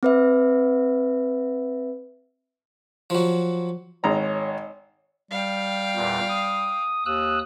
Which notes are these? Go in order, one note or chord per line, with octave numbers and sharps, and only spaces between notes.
C4 B4 E5
F3 F#3
G#1 C#5 A#5
G3 F5 G5
E2 A#2
D#6
D#2 D#6 E6 F#6